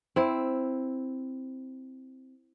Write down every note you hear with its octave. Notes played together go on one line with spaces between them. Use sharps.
C4 E4